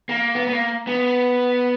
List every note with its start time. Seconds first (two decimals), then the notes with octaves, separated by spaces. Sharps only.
0.09 A#3
0.35 B3
0.47 B3
0.53 A#3
0.87 B3